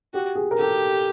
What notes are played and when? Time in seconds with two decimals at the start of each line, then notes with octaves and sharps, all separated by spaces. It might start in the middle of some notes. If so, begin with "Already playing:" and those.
0.14 F#4 G4
0.35 G#4
0.51 A#4
0.58 G4 A4